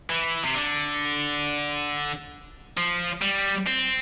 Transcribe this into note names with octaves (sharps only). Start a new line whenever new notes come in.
E3
C3
D3
F3
G3
C4